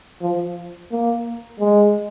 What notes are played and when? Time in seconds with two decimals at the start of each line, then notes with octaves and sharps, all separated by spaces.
0.22 F3
0.92 A#3
1.60 G#3